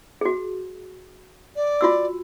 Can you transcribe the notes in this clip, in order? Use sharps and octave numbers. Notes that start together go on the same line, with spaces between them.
F#4 G#4
D5
F4 F#4 E6